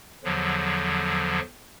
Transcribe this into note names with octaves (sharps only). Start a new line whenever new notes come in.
E2 D3 F3 F#3